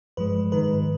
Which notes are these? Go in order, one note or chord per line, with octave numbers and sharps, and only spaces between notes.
G2 F3 G#3 B4
G#2 D#3 G#3 B4